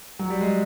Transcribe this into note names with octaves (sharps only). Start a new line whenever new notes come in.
F#3
G3
G#3